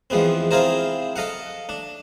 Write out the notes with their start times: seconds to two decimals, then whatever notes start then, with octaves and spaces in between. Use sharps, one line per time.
0.10 E2 F3 G#3 B3 C4
0.51 C4 E4 F4 G#4 A#4 C5
1.16 A4 D#5 F5 F#5
1.69 D4